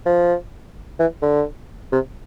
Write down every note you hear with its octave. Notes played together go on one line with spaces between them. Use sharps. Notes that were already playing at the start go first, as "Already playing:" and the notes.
F3
E3
D3
C3